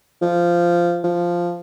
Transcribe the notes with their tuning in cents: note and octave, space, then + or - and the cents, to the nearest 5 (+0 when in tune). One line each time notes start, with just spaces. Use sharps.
F3 -10
F3 -5